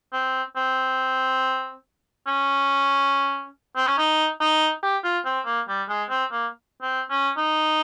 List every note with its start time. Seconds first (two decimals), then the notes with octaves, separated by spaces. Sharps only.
0.13 C4
0.57 C4
2.27 C#4
3.77 C4
3.87 C#4
3.98 D#4
4.41 D#4
4.83 G4
5.04 F4
5.25 C4
5.46 A#3
5.68 G3
5.89 G#3
6.10 C4
6.32 A#3
6.82 C4
7.10 C#4
7.38 D#4